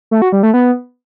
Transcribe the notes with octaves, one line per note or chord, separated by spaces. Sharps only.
A3
F#4
G3
A3
B3